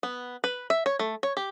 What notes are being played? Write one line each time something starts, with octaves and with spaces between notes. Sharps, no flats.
B3
B4
E5
C#5
A3
C#5
G4